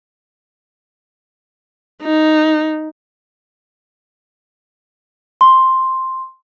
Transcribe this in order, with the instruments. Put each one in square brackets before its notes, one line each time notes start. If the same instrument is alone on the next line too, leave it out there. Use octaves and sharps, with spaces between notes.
[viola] D#4
[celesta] C6